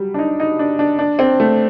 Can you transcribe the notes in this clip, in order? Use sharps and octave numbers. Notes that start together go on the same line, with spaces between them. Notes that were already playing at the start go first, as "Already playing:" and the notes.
Already playing: F#3 G3
D4
D#4
D#4
D4
D4
D4
C4
A3